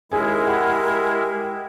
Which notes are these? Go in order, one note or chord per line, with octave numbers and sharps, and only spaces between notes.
D#2 G#3 E4 G#4 A#4 G#5
G4 F#5 G#5 B5